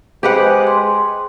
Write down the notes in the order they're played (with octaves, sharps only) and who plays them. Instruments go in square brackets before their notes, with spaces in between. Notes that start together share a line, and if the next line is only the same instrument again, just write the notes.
[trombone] G#3 [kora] G4 B4 F#5 [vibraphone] C5 D6
[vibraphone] C6